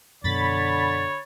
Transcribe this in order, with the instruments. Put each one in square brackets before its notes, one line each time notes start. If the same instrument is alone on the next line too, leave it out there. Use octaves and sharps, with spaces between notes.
[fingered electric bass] F#2 B2 [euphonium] D3 [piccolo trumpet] C#5 [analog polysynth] B5 A6